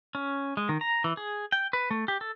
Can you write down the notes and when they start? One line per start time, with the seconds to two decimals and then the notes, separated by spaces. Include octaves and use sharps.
0.15 C#4
0.57 G#3
0.69 D#3
0.81 A#5
1.04 E3
1.17 G#4
1.52 G5
1.73 B4
1.91 A3
2.08 G4
2.21 A4